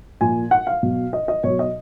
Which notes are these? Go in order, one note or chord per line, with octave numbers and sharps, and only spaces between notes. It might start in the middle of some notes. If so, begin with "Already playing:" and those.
A#2 F3 G#5
F#5
F5
B2 F#3
D#5
D#5
B2 F#3 C#5
D#5